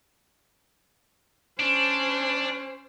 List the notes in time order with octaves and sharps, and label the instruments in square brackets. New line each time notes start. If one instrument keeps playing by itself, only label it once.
[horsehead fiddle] C#4 C5 [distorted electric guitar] D4